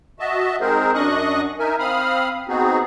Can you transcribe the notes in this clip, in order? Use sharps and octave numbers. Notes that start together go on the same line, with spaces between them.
F#4 D#5 E5 A5
G#3 C4 D#4 G#4 A#4 C5
F#2 D4 D#5 C#6 D#6 F#6
D#4 A#4 E5 G#5
C4 F5 B5 D#6 F6
B3 C4 D#4 F#4 G#4